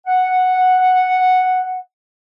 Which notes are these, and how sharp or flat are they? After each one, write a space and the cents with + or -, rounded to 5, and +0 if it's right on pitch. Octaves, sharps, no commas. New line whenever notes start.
F#5 -5